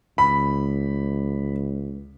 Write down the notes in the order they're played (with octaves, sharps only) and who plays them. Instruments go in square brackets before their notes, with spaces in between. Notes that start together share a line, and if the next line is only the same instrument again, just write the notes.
[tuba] C#2 [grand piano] B5